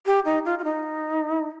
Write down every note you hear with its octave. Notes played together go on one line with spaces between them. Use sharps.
G4
D#4
F4
F4
D#4